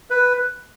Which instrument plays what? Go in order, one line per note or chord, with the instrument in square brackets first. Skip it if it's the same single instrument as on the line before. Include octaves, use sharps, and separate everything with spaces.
[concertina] B4